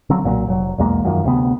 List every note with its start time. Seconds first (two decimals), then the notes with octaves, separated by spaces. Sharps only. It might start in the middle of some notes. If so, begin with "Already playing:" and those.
0.10 D3 F3 F#3 C4
0.24 B1 A#2 E3 F#3
0.47 F1 F#3
0.78 B1 E2 G#3 A#3
1.05 F#2 D#3 F3
1.24 D2 C3 B3